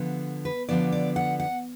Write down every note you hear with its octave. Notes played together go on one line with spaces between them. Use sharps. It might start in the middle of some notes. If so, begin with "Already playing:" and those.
Already playing: D3 F3 B3
B4
D3 F3 B3 D5
D5
F#5
F#5